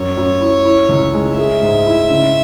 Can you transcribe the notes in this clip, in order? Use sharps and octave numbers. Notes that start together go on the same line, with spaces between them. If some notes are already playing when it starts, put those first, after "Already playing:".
Already playing: F#2 C#5
F#2
E4
E4
C#2
G#3
G#4 E5
G#2
E4
C#3